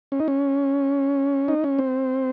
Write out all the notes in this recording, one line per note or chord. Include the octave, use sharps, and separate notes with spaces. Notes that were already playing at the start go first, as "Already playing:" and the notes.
C#4
D#4
C#4
D#4
C#4
C4